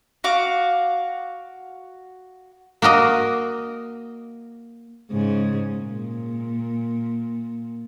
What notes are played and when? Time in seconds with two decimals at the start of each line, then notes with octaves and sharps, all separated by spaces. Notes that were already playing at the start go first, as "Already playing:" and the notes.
0.24 F#4 F5 D6
2.82 A#3 F#4 A#4 D#5
5.11 G#2 C#3 G#4
5.78 A#2